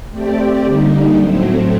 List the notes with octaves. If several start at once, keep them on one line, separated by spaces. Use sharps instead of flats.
A3 C4 G4 D5
D3 G3 A#3 D#4
A2 F#3 A3 C4